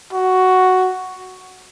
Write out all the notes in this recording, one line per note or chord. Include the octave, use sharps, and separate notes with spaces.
F#4